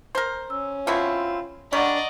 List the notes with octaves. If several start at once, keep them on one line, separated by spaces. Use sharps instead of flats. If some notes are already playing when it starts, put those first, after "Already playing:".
A#4 C5
C#4 E6
B2 C4 E4 F4
G3 D4 D5 D#5 F#5 A#5 C#6